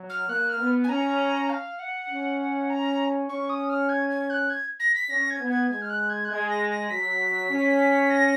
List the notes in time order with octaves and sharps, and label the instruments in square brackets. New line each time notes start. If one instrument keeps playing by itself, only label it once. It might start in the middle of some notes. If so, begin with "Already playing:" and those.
Already playing: [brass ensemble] F#3
[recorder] F6
[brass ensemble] A#3 [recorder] F#6
[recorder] F6
[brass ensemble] B3
[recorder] G#5
[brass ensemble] C#4 [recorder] A#5
[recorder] F5
F#5
[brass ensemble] C#4
[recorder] A#5
[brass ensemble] C#4 [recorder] C#6
[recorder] D#6
F6
G#6
G#6
F#6
G#6
A#6
B6
[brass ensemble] C#4 [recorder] A#6
[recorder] G#6
[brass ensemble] B3
[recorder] G#6
[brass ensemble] G#3 [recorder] G#6
[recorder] F6
F#6
G#6
F#6
[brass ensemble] G#3 [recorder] G#6
[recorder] A#6
A#6
[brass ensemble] F#3 [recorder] B6
[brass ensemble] C#4
[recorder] A#6